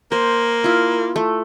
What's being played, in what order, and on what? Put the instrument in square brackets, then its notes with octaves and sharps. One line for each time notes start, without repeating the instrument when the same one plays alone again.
[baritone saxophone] A#3 [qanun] C5
[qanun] E4 F4
A3